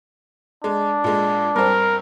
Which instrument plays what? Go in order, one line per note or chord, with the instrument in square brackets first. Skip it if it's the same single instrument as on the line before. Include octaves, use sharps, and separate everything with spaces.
[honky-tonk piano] G#3 [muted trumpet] D4
[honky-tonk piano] A#2 G#3
[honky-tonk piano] G2 C4 [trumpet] A#4